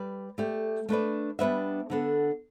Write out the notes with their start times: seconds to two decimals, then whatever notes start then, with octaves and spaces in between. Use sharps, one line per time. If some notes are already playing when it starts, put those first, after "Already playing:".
Already playing: G3 B4 D5
0.38 A3 G4 D5
0.89 A3 D4 B4 D5
1.39 G3 B3 D4 B4 E5
1.90 D3 B3 D4 A4